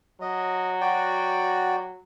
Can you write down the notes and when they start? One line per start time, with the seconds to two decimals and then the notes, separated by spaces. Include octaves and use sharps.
0.21 F#3 D#5
0.81 F#4 D5 G5